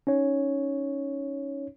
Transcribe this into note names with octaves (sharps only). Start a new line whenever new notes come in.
C#4 D#4 C#5